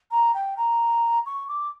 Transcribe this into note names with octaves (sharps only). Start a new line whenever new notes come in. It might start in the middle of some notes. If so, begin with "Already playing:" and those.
A#5
G5
A#5
C#6
D6